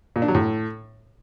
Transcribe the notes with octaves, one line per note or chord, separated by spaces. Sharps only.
A#2
D4
F#3
A2